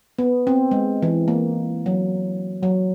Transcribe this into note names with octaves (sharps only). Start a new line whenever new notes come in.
B3
C4
G#3
E3
A#3
F#3
F#3